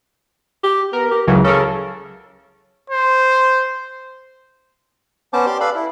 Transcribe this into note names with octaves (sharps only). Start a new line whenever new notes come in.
G4
B3 A#4
G4
C#2 C#3 E3 F#3
C#3 A4 A#4
C5
B3 C#4 C5 A5 D6
G4 D5 C6 D6
A4 B4 D5 F5 B5
E4